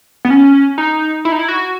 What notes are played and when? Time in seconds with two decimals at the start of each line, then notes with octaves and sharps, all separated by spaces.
0.25 B3
0.30 C#4
0.78 D#4
1.25 E4
1.32 D#4
1.39 E4
1.48 F#4